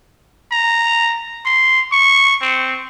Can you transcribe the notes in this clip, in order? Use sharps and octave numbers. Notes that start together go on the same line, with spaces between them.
A#5
C6
C#6
C4